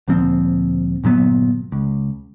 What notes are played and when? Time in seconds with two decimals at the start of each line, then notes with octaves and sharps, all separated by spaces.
0.08 D2 A#2 F3 C4
1.04 G1 A#2 F#3 B3
1.72 C#2